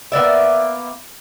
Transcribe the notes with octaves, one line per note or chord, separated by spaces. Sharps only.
A#3 B3 D5 E5